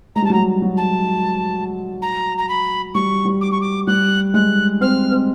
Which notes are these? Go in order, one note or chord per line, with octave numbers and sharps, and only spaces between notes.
G#3 A#5
G3 A5
F#3
G3 A#5
F#3
A5
A#5
A#5
B5
G3 C#6
G3
D6
C#6
D6
G3 F#6
G#3 F#6
C4 F6
C4